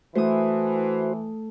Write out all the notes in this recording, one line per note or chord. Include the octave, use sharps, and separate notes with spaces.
E3 A3 F#4 C5 D#6